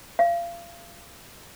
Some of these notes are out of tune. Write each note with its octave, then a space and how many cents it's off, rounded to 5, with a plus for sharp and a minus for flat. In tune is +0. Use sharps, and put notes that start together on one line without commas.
F5 -30